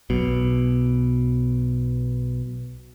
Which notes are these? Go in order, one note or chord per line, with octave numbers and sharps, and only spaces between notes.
B1 B2